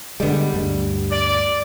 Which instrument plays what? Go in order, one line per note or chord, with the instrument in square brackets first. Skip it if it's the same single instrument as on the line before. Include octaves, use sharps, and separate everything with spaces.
[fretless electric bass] D3 G#3 [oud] G3 B3
[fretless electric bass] D2 G2
[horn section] D5